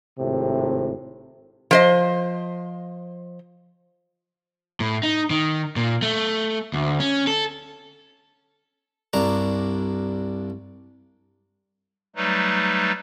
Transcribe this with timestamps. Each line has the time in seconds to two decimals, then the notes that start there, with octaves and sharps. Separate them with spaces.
0.19 G#1 A2 C3
1.71 F3 C5 D#5
4.80 A2
5.03 D#4
5.30 D#3
5.76 A#2
6.02 A3
6.73 D2
7.00 C#4
7.27 A4
9.13 C2 G2 D4 A#5
12.16 F#3 G3 A3 D#4 B4